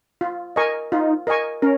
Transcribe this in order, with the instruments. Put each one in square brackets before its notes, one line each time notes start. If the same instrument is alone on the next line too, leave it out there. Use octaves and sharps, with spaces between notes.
[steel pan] F4
A#4 D#5 G#5 C#6
[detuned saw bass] D#4 [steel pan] F4
[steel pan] A#4 D#5 G#5 C#6
[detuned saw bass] C#4 [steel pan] A#4